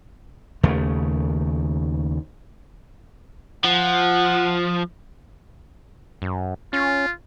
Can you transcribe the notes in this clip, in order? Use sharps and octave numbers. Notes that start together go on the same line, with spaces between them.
D#2 C#3 A3
F3 F#5
F#2
C#4 F4